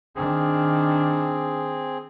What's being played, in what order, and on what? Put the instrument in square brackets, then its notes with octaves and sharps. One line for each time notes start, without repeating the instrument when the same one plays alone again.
[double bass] D#3 D4 [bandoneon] C4 G#4